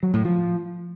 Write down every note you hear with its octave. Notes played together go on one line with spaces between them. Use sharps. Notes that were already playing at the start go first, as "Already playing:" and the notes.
F#3
A2
F3